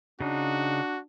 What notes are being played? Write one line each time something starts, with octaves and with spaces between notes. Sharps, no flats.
C#3 D4 D#4 F#4